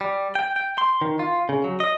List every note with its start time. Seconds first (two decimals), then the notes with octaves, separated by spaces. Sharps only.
0.01 G3
0.35 G5
0.56 G5
0.78 C6
1.01 D#3
1.19 F4
1.49 C#3
1.64 F#3
1.80 D#5